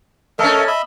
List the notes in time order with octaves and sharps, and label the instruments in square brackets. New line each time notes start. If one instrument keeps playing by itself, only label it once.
[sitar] A3 C#4 [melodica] A4 A#4 D#5
[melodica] D#5 E5 B5